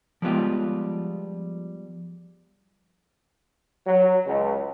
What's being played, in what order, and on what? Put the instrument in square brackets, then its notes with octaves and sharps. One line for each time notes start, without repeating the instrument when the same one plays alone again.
[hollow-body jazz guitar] F3 G3 G#3 B3 F4 G4
[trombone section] F#3
C#2